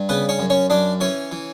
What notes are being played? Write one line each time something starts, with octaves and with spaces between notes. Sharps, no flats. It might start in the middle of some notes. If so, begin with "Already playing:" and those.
Already playing: G2
C#3 B3 B4
C#4 C#5
F#2
C#4 C#5
F#2 D4 D5
E3 C#4 C#5
E3